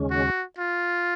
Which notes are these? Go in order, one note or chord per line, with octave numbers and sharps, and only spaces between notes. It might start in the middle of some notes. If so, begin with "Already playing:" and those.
Already playing: D#2 C#3 G#3 C#4
F#4
F4